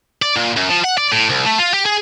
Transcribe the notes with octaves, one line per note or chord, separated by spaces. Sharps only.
D5
A#2
F#2
F3
F#5
D5
A2
C2
A3
F4
G4
G#4